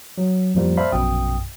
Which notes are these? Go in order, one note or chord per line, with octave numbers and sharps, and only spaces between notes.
F#3
F2 A2 F3 G3 A#3
C5 D5 E5 F5 A5 B5
A#1 F#2 B2 G5 D#6